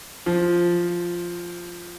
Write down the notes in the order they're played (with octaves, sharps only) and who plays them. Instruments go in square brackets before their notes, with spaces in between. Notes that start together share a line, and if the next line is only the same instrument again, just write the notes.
[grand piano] F3